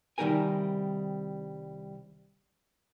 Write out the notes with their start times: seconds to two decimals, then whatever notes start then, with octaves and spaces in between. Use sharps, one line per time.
0.18 C2 D#3 G3 D#4 A#4 G#5